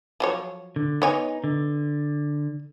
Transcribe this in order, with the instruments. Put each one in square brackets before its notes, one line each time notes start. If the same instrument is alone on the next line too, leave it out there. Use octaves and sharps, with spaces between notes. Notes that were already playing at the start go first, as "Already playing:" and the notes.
[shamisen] F3 F#3 C#5
[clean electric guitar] D3
[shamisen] B3 C#5 G#5 [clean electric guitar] D#4
[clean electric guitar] D3